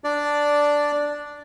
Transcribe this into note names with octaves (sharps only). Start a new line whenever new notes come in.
D4 D5